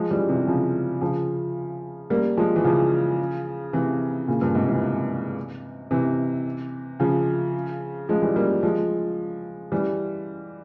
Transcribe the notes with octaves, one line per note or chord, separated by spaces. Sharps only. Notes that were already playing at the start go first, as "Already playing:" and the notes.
Already playing: F3 G#3
E3 G3
C3 E3
C#3 F3
C#3 F3
G3 A#3
F3 G#3
E3
C#3 F3
C3 E3
A#2 C#3
G2 A#2
G#2 C3
C3 E3
C3 E3
C#3 F3
F3 G#3
E3 G3
G3 A#3
F3 G#3
E3 G3